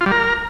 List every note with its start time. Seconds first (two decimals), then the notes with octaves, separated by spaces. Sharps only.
0.01 F4
0.06 G3
0.11 A#4